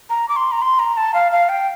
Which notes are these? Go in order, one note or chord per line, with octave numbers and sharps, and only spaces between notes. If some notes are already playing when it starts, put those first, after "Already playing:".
A#5
D6
C6
A#5
C6
A#5
A5
F5
F5
G5